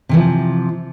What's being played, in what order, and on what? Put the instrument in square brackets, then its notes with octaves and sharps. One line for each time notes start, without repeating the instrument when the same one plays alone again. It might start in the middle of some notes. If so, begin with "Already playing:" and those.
[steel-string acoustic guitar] C3 E3 F3